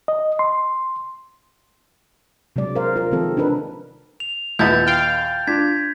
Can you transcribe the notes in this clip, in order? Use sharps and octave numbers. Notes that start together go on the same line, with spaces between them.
D#5
C6
C3 F#3 G#3 D5
A#4 C5 F5
F4 A#4
D#3 F3 G#3 C4 A4
D4 D#4 A#4 B4
F7
A#1 D#2 B3 E4 G6 A6
F5 G5 F6
D4 F4 G#6 B6